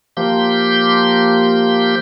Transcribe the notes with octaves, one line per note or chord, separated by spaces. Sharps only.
F3 A#3 G4 C6 G6